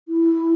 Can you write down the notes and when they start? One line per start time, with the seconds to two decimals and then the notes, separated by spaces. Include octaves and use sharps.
0.08 E4